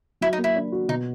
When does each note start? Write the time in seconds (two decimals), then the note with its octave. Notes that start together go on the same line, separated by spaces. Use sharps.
0.21 F#3 E4
0.33 D#4
0.38 A#3
0.44 E4
0.55 D4
0.72 F#4
0.88 B2 D#4